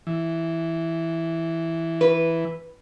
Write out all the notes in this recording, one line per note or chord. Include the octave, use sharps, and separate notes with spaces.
E3
B4